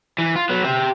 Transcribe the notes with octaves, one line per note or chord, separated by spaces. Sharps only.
E3
F4
F#3 B3
G4 E5